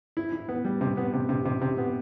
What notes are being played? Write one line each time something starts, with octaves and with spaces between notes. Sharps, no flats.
E4
E4
B3
G3
C3
B3
C3
C3
C3
C3
B3